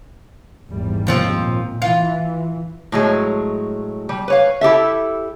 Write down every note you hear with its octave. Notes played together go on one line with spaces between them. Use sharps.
G#1 E2 G3
D#2 F3 C4
A#2
E3 F4
A2 F#3 G#3
G3
B4 C#5 F5
E4 G4 A4 E5